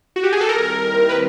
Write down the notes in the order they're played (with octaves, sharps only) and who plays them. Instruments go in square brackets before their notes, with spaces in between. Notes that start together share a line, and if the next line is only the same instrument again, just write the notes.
[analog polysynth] F#4
G4
G#4
A4
[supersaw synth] D#2 D#3 G3 C4 E4 [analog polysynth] A#4
[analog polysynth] B4